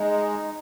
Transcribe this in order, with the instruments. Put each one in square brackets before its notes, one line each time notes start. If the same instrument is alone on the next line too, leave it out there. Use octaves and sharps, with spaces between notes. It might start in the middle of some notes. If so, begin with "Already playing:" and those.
Already playing: [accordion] G#3 [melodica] D#4